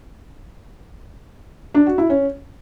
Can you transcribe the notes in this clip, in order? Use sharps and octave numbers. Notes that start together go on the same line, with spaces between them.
D4
F#4
E4
C#4